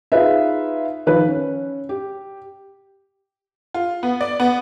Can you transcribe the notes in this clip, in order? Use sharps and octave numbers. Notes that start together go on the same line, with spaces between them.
D#4 F4 G#4 B4 E5
D#3 F3 B4
C#4
G4
F4
B3
D5
B3